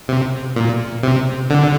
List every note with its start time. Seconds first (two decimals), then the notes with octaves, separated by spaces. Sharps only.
0.08 C3
0.56 A#2
1.03 C3
1.50 D3